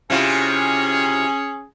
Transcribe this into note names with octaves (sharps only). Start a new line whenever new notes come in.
C3 C#4 E4 F4 G#4